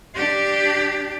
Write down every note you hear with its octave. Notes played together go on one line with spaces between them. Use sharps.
D4 G4